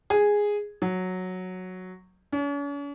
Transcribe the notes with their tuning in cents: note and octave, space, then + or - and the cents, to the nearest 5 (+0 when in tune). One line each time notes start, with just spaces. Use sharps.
G#4 -5
F#3 -5
C#4 +45